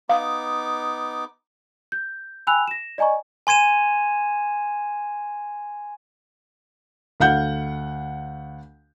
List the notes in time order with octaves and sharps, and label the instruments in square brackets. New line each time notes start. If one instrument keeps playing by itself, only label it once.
[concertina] B3 D#4 D6 [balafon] F5
[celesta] G6
G5 G#5 B5 E6 F#6 F7
A#6 E7
D5 D#5 G#5 A#5 C#6
[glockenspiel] G#5 C6 G#6 D#7 E7
[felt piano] D2 F5 F#5 G6